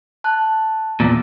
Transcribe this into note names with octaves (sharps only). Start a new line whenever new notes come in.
A5 F#6
E2 A#2 D5